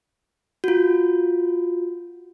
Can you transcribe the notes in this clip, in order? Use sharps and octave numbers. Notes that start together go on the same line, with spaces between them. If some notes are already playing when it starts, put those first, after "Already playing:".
F4 F#4